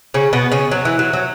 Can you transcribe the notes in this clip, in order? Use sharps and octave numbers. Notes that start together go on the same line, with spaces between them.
C#3 C#4
B2 B3
C#3 C#4
F#3
E3
F#3
F#3